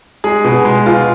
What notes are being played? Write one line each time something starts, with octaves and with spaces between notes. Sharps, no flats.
G#3 G#4
B2
G#3
B2 F4